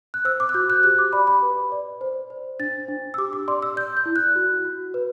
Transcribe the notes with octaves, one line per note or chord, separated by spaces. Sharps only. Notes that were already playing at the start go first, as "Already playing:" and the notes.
F#6
C5 E6
D6
F#6
F#4 G6
F#6
G4 F#6
D6
D5 B5
B5
B4
D5
C5
C5
D4 A6
D4
E6
G4 D6
D6
D5 C6
E6
D5 G6
G6
E4
F#6
F#4
F#4
B4